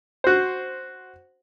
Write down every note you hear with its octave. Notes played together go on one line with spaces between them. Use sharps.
F#4 C5